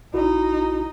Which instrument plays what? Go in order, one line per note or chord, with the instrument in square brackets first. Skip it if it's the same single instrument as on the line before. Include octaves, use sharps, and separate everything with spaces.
[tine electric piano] A#1 E4 F#4 [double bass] D#4